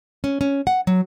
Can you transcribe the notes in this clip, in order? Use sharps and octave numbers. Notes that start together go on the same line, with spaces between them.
C#4
C#4
F#5
F#3